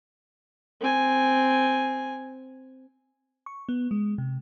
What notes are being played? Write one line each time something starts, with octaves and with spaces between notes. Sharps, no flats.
C4 G#5
C#6
B3
G#3
C3